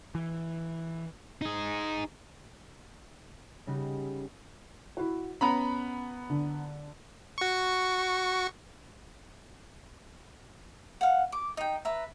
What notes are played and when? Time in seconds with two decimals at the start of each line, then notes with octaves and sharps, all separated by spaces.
0.15 E3
1.42 D#4 G#4
3.67 C#3 G3 D#4 F#4
4.97 E4 F#4
5.41 B3 C#4 A#5 B5
6.30 D3
7.38 F#4 C#6
11.01 F5 F#5
11.32 D6
11.57 D#4 G5
11.85 B4 E5 A#5